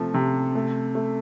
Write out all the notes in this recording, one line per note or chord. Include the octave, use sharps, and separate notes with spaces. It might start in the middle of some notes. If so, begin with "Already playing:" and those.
Already playing: C3 F3 A3
C3
A3
A3